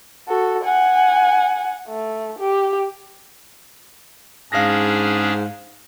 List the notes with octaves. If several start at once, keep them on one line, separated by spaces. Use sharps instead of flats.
F#4 A4
F#5 G#5
A3
G4
G#2 C#4 D4 G#4 F5 A#6